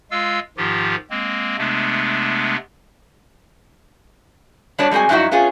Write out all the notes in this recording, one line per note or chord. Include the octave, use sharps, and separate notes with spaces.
G#3 F4 F5 E6
G#2 D#3 F3 F4 G4
G#3 A#3 C4
C3 G#3 A3 B3 D4
G3 B3 D4 F#4 C#5
G3 G#3 C4 F#4 G#5
G2 F#3 D#4 E4 F#4
B3 C#4 F4 G#4